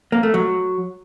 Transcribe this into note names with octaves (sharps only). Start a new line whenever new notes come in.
A#3
A3
F#3